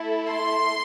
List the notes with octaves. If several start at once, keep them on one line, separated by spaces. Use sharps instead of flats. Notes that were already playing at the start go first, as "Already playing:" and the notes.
Already playing: A3 E4 A4
C6